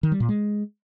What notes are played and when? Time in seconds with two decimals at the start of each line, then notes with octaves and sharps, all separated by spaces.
0.03 D#3
0.12 G3
0.20 A#2
0.29 G#3